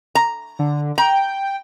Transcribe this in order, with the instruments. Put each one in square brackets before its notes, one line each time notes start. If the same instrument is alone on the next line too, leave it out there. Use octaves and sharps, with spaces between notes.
[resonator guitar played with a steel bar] A#5
[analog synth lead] D3
[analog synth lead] G5 [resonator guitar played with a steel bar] A#5